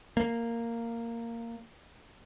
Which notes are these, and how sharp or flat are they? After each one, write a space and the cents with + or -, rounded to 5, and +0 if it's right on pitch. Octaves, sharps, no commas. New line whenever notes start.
A#3 -10